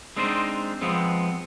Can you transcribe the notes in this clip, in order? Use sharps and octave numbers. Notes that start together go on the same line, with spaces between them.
G#3 C4 D4 D#4 C5
F3 G#3 B3 C4